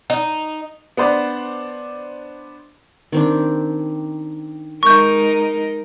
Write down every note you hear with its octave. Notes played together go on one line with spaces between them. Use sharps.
D#4
B3 D4 C5 D5
D#3 C4 D4
G#3 D#4 A#4 C#6 G6